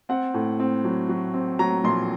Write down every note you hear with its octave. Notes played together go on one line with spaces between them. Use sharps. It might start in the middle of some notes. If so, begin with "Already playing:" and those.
C4 F#5
A2
C4
F#3
F#3
C4
F#3 A#5
A#1 C6